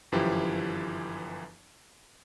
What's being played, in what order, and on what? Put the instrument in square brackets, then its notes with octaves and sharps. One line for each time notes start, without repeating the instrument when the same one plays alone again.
[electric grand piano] G1 F#2 E3 F3 E4 G4